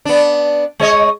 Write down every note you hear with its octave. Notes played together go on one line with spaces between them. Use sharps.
B3 D4
G#3 C#5 D#5